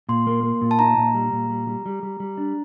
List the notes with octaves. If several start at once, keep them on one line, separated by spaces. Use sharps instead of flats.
A#2 C6
A#3
A#3
A#2
A5
D#4 A#5
A#2
G3
A#2
G3
G3
G3
G3
G3
D4